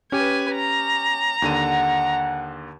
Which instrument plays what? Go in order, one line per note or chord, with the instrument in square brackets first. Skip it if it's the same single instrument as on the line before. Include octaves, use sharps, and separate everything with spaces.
[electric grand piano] C#4 G4 [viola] B4 G#5
[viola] A#5
[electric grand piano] D#2 D3 D#7 [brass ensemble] F#5